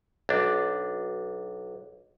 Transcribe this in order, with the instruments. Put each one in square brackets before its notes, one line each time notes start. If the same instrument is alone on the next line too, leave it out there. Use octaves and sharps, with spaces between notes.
[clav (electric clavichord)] B1 D4